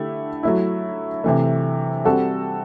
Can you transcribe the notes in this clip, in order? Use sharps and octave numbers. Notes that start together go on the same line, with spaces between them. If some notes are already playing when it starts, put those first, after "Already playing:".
Already playing: D3 A3 E4 G4
F#3 A3 E4
C3 E3 A3
G3 C4 F#4 A4